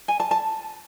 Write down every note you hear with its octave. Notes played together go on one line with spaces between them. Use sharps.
G#5
A5
A5